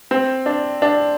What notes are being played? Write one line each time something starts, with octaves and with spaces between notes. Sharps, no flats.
C4
D4
D4